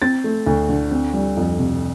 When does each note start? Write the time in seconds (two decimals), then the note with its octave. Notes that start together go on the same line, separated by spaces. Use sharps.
0.02 C4 A6
0.24 A3
0.46 D2
0.69 D3
0.91 C4
1.14 G3
1.37 F2
1.59 C3